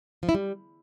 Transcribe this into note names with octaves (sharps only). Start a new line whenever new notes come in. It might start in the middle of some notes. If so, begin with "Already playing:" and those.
F3
E4
G3